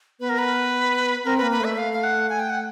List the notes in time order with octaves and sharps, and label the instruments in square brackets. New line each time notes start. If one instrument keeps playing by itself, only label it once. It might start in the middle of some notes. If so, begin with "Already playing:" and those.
[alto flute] B3 [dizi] B4
[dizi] A#4
B4
[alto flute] C4 [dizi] A#4
[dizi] B4
[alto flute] A#3
[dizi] B4
[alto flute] A3 [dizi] E5
[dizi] F5
F5
F#5
G#5
G5
F#5